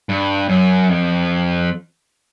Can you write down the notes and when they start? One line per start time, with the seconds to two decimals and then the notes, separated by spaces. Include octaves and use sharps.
0.09 G2
0.49 F#2
0.89 F2